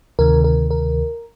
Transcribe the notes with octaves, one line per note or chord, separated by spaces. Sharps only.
D2 C3 D#3 A#4
A#4
A#4